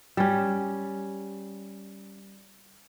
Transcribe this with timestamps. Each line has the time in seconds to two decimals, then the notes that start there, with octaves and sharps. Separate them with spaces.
0.17 G3 C#4